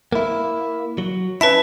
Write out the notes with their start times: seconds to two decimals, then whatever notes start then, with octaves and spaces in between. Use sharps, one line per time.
0.12 A#3 E4
0.98 F#3
1.41 C#4 E4 B4 A5 B6